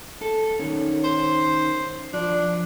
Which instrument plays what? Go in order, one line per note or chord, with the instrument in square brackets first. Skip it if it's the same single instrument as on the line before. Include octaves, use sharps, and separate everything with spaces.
[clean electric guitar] A4
D#3 C#4
[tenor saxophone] C5
[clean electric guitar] F3 [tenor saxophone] D4